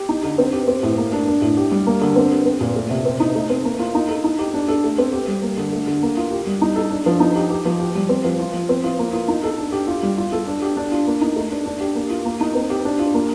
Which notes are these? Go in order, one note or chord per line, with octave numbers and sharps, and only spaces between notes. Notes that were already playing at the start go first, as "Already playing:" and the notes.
Already playing: G4
D#4
D3
C4
G4
C4
A2
A#3
D4
D4
A2
G4
G3
A#3
D3
C4
G4
C4
A#2
A3
C3
C4
D#4
A3
C4
A#3
F4
D#4
A4
D#4
G4
D4
A4
A3
C4
G4
G3
A#3
D3
A3
D3
A#3
F4
G4
G3
D#4
A4
D4
F3
D#4
G4
G4
F3
G4
G3
C4
F3
F4
F3
C4
F4
A#3
F4
D#4
A4
D4
G4
F4
G3
F4
A4
D4
G4
D4
F4
A#3
D#4
A3
D4
D4
G4
A#3
F4
A#3
D#4
C4
G4
D4
F4
A#3